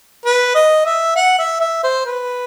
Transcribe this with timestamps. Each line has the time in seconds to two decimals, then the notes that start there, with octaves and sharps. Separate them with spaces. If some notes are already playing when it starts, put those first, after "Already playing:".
0.25 B4
0.55 D#5
0.85 E5
1.16 F#5
1.38 E5
1.61 E5
1.83 C5
2.06 B4